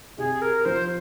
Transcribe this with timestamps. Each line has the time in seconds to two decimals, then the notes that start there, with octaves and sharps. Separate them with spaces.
0.18 C3 G#4
0.42 A#4
0.65 F3 C5